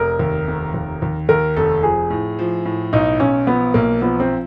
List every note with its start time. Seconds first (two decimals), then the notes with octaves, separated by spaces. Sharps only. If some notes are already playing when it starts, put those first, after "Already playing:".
Already playing: F1 A#4
0.19 D#2
0.48 F1
0.74 D#2
1.02 D#2
1.29 D#2 A#4
1.57 F1 A4
1.83 F3 G#4
2.10 A2
2.39 F3
2.65 A2
2.93 B1 D#4
3.20 B1 C#4
3.47 F3 B3
3.74 B1 A#3
4.01 F3 B3
4.20 C4